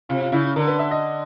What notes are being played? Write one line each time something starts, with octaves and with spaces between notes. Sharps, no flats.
C3 F4
F4
C#3 E4
E4
D3 A#4
B4
E5
D#5